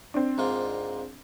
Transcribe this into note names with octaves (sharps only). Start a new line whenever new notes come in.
C4 D4
G#2 A#3 F4